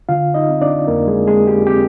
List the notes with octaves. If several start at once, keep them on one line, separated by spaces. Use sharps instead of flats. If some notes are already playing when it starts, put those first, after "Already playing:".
D3 F4 F5
D#4 D#5
C4
D4 D5
F2 A#3 A#4
G#3 G#4
G#3 C4 G#4
G4
C4 G4